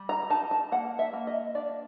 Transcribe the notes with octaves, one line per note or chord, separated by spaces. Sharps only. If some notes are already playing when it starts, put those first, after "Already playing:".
Already playing: G3
A#5
D#4 A5
A5
A#3 F#5
E5
A#3
D#5
D4 D5